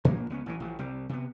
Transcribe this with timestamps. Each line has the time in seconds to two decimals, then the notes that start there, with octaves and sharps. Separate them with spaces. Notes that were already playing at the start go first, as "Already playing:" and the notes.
0.05 A#2 F3 A#3 D4
0.30 C#2 B3 C#4
0.46 A1 A2 C3 E3
0.60 A1 F3
0.79 C2 G3 C4
1.09 C3 B3